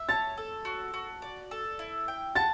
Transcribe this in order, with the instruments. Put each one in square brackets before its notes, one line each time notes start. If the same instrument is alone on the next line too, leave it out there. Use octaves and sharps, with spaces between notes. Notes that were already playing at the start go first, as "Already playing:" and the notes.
Already playing: [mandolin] E5
[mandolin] C#5 [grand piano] A5 A6
[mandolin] A4
F#4
F#4
D5
A4
E4
G5
[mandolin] F#5 [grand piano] A5 A6